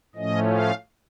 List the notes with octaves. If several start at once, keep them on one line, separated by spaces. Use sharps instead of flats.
A2 F3 A3 C#4 D#5
F5